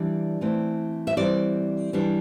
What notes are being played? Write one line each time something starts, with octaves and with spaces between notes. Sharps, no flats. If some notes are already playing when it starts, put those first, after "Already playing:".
Already playing: E3 G3 D4 D5
E3 A3 C4
E5
E3 G3 C4 D5
E3 G3 D4